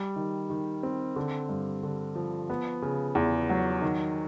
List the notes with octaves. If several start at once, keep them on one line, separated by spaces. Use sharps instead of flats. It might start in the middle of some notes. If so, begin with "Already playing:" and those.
Already playing: G3
D#3
D#3
C4
D3
G2
D3
F3
B3
C#3
E2
F#3
D#3